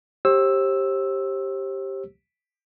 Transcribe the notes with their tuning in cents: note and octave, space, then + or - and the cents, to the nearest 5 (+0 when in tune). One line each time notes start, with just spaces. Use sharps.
G4 +0 C5 +40 E6 +0